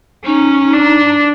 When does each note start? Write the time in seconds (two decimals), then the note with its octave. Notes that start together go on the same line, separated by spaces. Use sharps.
0.25 C#4 D#4
0.73 D4